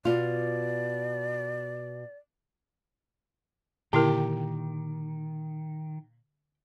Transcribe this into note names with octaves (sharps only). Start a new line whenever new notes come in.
B2 F4 D5
A#2 D3 D#3 E4 G4 A#4